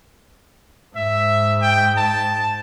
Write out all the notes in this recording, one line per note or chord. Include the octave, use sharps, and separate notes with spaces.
G#2 E5
G5
A5